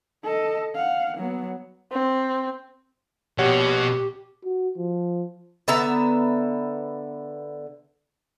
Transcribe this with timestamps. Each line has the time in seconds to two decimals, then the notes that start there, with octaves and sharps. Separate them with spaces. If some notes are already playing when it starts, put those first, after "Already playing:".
0.24 A4 D#5
0.75 F5 F#5
1.17 F#3 B3
1.92 C4
3.38 A#1 B2 G4 C#5 F#5
4.45 F#4
4.77 F3
5.68 D3 B3 E5 A#5